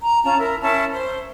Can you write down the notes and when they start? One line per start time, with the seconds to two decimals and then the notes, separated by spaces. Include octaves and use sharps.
0.01 A#5
0.23 C#4 F4 A5 A#5
0.37 E4 A#4
0.61 C#4 E4 A5
0.91 C5